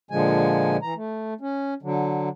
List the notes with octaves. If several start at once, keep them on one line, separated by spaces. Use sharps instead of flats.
A#2 D3 F3 G#3 G#5
E3 A#5
A3
C#4
D3 F#3